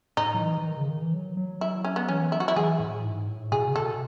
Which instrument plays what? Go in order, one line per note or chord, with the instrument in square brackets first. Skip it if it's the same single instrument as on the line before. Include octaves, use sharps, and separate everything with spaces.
[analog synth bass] A2 [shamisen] D#4
[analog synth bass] F#3
E3
E3
D#3
C#3
D#3
E3
F#3
F#3
[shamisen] E4
C#4
B3
[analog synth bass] E3 [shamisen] C#4
[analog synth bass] F#3 [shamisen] E4
[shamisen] F#4
E4
[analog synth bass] E3 [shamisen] G#4
[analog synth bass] A2
G#2
A2
[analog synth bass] B2 [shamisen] G#4
[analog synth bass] C#3
[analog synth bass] B2 [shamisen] A4